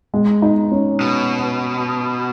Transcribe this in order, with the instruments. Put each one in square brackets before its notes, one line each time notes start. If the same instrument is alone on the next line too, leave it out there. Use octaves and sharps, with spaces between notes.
[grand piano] G#3
D#4
C#4
[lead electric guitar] B2